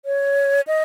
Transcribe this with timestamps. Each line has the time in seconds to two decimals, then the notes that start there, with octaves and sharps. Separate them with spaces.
0.05 C#5
0.67 D#5